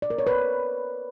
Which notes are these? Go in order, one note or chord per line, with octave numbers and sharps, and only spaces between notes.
D5
A#4
C#5
B4